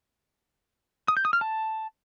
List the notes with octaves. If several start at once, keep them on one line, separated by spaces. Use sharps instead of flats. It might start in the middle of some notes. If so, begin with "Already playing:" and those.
D#6
G6
D#6
F6
A5